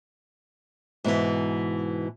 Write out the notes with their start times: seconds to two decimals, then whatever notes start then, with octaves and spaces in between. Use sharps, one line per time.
1.04 G#2 B2 D3 E3